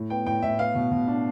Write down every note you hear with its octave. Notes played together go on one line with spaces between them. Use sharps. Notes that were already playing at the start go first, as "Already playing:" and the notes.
Already playing: A2
B3 G5
A2 G5
A2 E5
B3 F5
B2
B2
D4